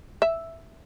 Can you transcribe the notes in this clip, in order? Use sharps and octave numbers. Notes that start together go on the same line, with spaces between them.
E5